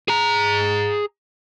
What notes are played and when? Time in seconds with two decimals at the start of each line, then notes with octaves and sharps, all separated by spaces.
0.08 G#4 A#5